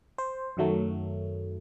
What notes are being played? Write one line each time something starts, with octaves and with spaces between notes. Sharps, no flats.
C5
F#2 D#3 F#3 A3